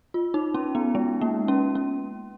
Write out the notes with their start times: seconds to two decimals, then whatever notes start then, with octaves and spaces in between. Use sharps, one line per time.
0.14 F4
0.34 D#4
0.54 C#4
0.75 B3
0.95 G#3
1.21 A#3
1.48 C#4
1.75 C#4